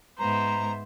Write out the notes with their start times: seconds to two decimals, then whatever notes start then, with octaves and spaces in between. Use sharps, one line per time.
0.19 G#2 B3 C5 E5 A#5